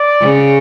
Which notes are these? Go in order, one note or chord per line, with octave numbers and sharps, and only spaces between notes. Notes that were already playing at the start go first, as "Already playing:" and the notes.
Already playing: D5
C#3